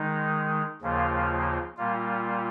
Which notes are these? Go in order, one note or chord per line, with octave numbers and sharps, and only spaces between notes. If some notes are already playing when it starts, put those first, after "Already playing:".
Already playing: D#3 G#3 D#4
D#2 C#3 F3 A#3 F4
A#2 G3 A#3 F4